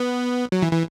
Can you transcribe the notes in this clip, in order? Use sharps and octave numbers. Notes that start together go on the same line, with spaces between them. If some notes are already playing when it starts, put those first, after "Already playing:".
Already playing: B3
F#3
E3
E3